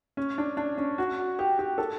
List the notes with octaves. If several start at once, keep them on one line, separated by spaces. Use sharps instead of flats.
C#4
D4
D4
C#4
F#4
G4
G4
A4